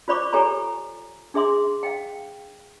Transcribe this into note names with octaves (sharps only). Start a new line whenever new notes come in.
F4 C5 D5 B5 C#6 D6
G4 A4 C#5 G#5 A#5 B5
D4 G#4 E5 C6 D6
F5 G5